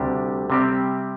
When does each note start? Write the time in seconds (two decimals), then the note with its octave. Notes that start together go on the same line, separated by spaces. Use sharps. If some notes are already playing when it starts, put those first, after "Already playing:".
Already playing: D2 C3 G3 D4 G4
0.50 C3 G3 C4 G4